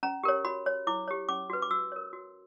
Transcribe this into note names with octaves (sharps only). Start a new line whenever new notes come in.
C#4 A#5
G4 A#4 C#5
F#4 B5
C#5
E4 D6
G4 C#5
C#4 D6
F#4 B4
D6
F#4 E6
A#4 C#5
F#4